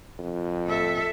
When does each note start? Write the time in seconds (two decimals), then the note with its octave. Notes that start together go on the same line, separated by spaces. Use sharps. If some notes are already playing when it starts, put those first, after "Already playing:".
0.19 F2
0.67 A4 E5